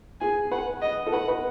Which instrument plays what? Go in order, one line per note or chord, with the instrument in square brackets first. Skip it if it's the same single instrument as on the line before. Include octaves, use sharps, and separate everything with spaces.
[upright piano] G#4 [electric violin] G#5
[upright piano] B4 [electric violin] F#5
[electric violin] D#5
[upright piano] A4
[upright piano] B4 [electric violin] F#5
[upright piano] B4